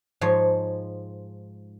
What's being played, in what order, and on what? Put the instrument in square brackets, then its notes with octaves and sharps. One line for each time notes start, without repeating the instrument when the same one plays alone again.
[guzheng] G#2 F3 C#5